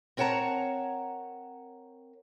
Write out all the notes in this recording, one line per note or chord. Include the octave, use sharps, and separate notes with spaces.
C4 A#4 C#5 F#5 A5 A#5